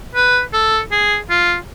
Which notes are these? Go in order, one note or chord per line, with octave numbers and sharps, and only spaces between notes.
B4
A4
G#4
F4